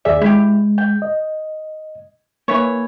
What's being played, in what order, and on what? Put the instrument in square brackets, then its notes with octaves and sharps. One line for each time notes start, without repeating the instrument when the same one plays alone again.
[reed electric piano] D#2 G#4 D5 [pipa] E5
[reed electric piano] G#3 [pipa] E4 G4
[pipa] G5
[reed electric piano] D#5
[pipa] E3 E4 C#5 [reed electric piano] A#3